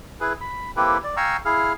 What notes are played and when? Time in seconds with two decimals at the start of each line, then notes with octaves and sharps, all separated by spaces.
0.21 E4 G#4 B4
0.41 B5
0.76 A#3 C4 E4 G4 A4 B4
1.04 D5
1.17 F5 G5 G#5 A#5 C#6 E6
1.45 E4 G#4 F5 F6